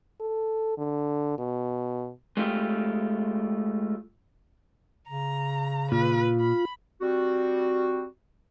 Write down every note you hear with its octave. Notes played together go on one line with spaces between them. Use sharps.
A4
D3
B2
G#3 A3 F4 G4
C#3 A#5
A#2 F4 B4
B5
G3 C4 F#4